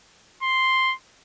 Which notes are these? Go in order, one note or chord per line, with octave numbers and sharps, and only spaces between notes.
C6